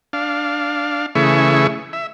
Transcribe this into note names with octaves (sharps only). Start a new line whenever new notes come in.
D4 F5
C#3 E3 A3 G#4 E5 C#6
E5